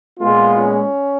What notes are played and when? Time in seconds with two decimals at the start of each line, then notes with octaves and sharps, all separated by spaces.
0.19 A#2 G#3 B3 F4
0.58 C#4